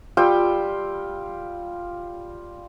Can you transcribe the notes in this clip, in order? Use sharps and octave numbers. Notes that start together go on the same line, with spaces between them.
G3 F4 G5 E6